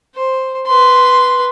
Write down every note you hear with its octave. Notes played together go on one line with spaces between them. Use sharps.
C5
B4 C6